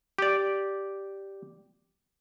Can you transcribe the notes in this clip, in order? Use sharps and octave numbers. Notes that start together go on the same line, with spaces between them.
G4 D5